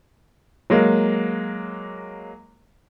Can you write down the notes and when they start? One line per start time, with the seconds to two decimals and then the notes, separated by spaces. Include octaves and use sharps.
0.70 F#3 G#3 A#3